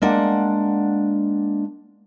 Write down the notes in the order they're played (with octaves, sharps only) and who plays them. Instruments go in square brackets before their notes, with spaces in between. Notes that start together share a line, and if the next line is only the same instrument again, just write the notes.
[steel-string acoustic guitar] G#3 A#3 D4 F#5